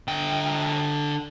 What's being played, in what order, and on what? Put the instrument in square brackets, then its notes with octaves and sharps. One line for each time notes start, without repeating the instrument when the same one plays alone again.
[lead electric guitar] D3 G5